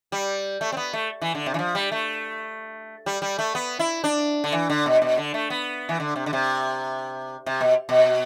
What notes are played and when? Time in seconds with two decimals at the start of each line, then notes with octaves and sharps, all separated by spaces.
0.12 G3
0.61 A3
0.72 C4
0.77 B3
0.93 A3
1.22 E3
1.35 D3
1.46 C3
1.54 E3
1.59 F3
1.75 G3
1.92 A3
3.06 G3
3.22 G3
3.39 A3
3.55 B3
3.79 E4
4.04 D4
4.44 D3
4.52 E3
4.70 D3
4.86 B2
5.02 B2
5.17 D3
5.34 A3
5.50 B3
5.89 E3
6.00 D3
6.16 C3
6.26 D3
6.33 C3
7.46 C3
7.61 B2
7.89 B2